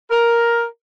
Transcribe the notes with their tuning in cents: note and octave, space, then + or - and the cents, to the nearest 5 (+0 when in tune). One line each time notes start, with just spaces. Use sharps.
A#4 +5